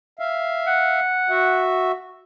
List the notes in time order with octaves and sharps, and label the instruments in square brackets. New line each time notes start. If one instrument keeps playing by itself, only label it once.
[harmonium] E5 F5
[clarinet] F#5
[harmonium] F#4 E5